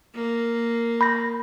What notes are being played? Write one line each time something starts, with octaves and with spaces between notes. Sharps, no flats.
A#3
B5 G6 A#6